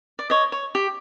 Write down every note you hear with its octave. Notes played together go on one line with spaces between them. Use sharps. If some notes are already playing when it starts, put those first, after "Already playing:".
D5
C#5 D#5
C#5
G4